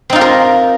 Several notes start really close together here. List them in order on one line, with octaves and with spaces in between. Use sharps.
C4 D#4 F4 G4 A#4